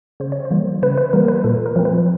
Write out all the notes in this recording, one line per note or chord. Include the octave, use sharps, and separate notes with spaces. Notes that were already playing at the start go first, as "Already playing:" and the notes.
C#3 C5
C#5
C5
E3 G3 A#3
C#3 B4
B4
E3 G3 A#3 A#4
B4
A#2 A4
A#4
F3 A3 C4
B4